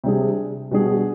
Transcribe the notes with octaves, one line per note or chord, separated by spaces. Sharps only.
C3 G3 D4 G#4
B2 G3 D4 G#4